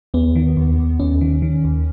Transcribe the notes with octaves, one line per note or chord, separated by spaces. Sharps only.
D#2 B3
D#3
D#2
D#2
D#2 C#4
D#3
D#3
D#2